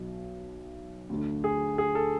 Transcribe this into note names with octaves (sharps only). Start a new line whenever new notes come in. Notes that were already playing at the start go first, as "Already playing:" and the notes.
Already playing: B1 B2
D2 D3
G#4
G#4
A4